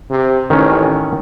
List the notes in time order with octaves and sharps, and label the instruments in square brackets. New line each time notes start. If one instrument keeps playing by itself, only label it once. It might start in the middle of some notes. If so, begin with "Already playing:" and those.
[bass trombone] C3
[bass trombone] A1 [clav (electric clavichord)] D#3 C#4